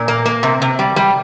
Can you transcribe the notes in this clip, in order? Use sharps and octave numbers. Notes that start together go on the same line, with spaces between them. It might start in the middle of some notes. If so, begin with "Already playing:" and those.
Already playing: A#2
A#3
A#3
C3
C3
G3
G3